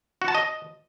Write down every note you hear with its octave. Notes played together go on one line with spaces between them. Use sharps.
F#4
A5
D#5